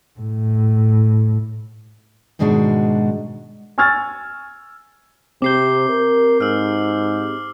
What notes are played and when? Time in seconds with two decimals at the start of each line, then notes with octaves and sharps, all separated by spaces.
0.20 A2
2.39 G#2 B2 D#3 G#3 D4 F#4
3.78 G#5 C#6 E6 F6 G#6 A6
5.42 C3 C4 G4 D6 G6 C7 G7
5.89 A#4
6.41 G#2 E6 F6